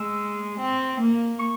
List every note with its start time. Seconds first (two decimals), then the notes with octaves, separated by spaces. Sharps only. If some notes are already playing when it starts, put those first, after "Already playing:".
Already playing: G#3 E6
0.60 C4
1.00 A#3
1.39 C#6